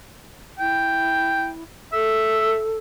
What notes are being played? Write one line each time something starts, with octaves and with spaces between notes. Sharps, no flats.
E4 G5
A4 E5